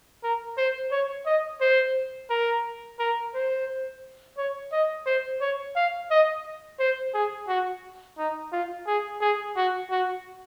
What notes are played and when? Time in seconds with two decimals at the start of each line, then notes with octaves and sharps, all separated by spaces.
0.23 A#4
0.58 C5
0.91 C#5
1.26 D#5
1.61 C5
2.30 A#4
2.99 A#4
3.34 C5
4.38 C#5
4.72 D#5
5.06 C5
5.41 C#5
5.76 F5
6.10 D#5
6.79 C5
7.14 G#4
7.48 F#4
8.18 D#4
8.52 F4
8.87 G#4
9.21 G#4
9.56 F#4
9.91 F#4